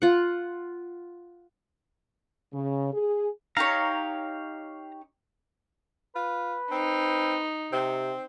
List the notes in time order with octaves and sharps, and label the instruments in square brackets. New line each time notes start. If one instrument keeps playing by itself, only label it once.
[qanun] F4 F#5
[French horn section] C#3
G#4
[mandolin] D#4 G4 C#5 [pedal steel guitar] F5 A#5
[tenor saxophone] F4 [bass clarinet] B4
[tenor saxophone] C4 [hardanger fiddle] D#4
[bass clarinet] C3 [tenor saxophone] C4